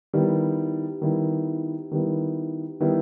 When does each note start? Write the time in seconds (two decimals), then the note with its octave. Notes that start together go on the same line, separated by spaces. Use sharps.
0.13 D#3 G3 B3 E4
1.02 D#3 G3 B3 E4
1.92 D#3 G3 B3 E4
2.81 D#3 G3 B3 E4